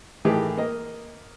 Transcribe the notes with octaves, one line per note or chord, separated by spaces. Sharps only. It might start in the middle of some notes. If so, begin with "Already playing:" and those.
A2 D#3 E3 A3 G4 G#4
A#3 D#5